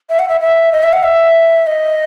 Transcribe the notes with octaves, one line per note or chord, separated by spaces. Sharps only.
E5
F#5
E5
E5
D#5
E5
F#5
E5
D#5